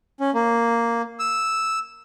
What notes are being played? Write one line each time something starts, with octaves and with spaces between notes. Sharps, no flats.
C#4
A#3
E6